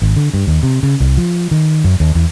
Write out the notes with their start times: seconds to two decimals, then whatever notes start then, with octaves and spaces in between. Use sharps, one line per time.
0.02 G#1
0.16 D3
0.34 G2
0.47 D#2
0.63 C3
0.83 C#3
1.00 C2
1.17 F3
1.51 D#3
1.84 F#2
2.00 D#2
2.15 E2